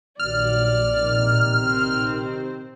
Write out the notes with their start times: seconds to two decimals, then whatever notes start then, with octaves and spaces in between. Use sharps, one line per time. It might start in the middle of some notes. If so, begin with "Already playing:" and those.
0.20 A#1 D#2 F#3 D5 F6
0.94 C3 D#3
1.62 C4